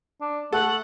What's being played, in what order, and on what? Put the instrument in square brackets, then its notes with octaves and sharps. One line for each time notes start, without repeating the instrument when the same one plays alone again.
[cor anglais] D4
[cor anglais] A3 [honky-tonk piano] A4 [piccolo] F#5